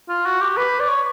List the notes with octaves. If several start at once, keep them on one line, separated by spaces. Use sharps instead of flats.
F4
F#4
G4
B4
D5
C#5